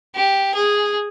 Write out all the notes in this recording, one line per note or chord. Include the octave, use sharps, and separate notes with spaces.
G4
G#4